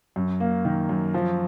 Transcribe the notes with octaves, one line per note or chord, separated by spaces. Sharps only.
F#2
A#3
D#3
F#2
F3